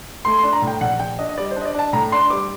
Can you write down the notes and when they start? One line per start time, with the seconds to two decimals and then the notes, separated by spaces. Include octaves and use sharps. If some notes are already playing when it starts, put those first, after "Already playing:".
0.25 A3 C6
0.39 D4 C6
0.53 A#5
0.62 A2
0.67 G5
0.81 A#1 F#5
1.00 A#1 G5
1.19 D4 D#5
1.29 D#5
1.38 G3 D5
1.51 C5
1.56 D4 D#5
1.65 D5
1.74 D4 A5
1.93 A2 A#5
2.12 D4 C6
2.30 G3 D6